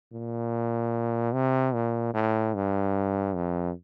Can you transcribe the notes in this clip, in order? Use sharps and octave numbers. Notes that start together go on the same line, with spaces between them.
A#2
C3
A#2
A2
G2
F2